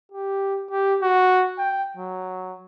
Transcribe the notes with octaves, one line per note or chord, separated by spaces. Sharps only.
G4
G4
F#4
G5
F#3